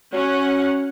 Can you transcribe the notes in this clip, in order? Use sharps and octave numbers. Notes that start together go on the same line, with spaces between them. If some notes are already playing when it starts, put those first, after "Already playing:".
F#3 C#4 F#5